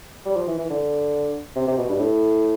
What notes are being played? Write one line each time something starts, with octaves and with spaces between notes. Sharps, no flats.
G3
F3
E3
E3
D3
C3
C3
B2
G2
A2